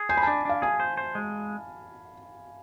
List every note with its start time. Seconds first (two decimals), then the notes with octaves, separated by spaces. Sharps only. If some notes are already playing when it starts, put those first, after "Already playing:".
Already playing: G#4
0.09 C5 G#5
0.17 B5
0.23 D4 A5
0.45 D4 F5
0.62 G#4 G#5
0.80 C5
0.97 C5
1.15 G#3